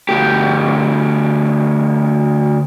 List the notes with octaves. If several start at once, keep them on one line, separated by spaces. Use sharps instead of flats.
D2 G4